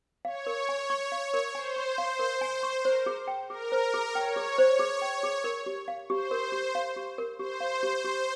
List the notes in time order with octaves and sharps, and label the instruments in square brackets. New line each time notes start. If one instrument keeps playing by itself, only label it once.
[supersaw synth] C#5 [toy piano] F5
[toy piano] A#4
G#5
C#6
F5
A#4
[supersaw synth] C5 [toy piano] G#5
[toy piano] C#6
F5
A#4
G#5
C#6
[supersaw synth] A#4 [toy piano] C5
[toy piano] G#4
G5
[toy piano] G#4 [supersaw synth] A#4
[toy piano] C5
[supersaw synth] A#4
[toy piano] G#4
[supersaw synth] C#5 [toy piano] G5
[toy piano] G#4
C5
G#4
G5
G#4
A#4
G4
F5
[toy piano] G4 [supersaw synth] C5
[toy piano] A#4
G4
F5
G4
A#4
[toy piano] G4 [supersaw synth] C5
[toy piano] F5
G4
G4